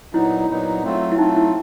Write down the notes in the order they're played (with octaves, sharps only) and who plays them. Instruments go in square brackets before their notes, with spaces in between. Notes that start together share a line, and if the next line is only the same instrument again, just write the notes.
[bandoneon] A#2 F#3 B3 D#4 [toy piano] E4
[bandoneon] A#2 F#3 B3 D#4
F#3 A3 C4 F4
[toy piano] E4
[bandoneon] F#3 A3 C4 F4 [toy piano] D#4
[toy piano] E4